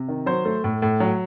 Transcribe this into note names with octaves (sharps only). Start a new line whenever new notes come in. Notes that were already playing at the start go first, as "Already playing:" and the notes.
Already playing: C3
D#3
F#3 C5
A3
A2
A2
F#3